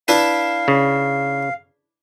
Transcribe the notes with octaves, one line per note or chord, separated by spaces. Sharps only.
D4 E4 B4 F5
C#3